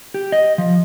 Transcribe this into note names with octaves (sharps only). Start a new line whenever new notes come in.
G4
D#5
F3